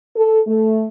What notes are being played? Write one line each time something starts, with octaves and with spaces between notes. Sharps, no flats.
A4
A3